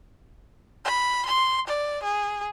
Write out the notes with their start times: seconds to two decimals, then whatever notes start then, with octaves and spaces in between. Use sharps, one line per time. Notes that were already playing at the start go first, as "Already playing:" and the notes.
0.85 B5
1.26 C6
1.67 D5
2.03 G#4